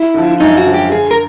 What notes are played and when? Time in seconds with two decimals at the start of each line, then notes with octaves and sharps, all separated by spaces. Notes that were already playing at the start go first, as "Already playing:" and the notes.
Already playing: E4
0.14 D3 F3
0.40 F#2 D#4
0.58 F#4
0.66 D3 F3
0.74 G4
0.92 D3 G#4
1.11 A#4